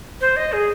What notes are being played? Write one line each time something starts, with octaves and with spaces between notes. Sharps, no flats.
C5
D#5
G#4